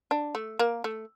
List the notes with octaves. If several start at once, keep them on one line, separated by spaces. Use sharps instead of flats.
D4
A3
A#3
A3